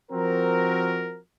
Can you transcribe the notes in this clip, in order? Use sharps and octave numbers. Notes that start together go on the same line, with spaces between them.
F3 C4 F#4 A#4